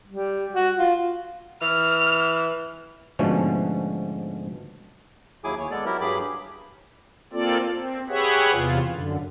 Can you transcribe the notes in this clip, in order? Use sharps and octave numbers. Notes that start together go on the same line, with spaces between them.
G3
F#4
F4
E3 F6
G#2 B2 D3 F3 A3 C#4
D#2 F#3 E4 G#4 G#5 D6
D#2 C#5
G#3 B3 A4 D5
F#3 E4 G4 A#4
G2 F#3 G4 G#4 B5 D6
A#3 C4 F4 A4 D5
C4
G4 G#4 B4 C#5 E5 F#5
E2 C3 F4
F#2 D3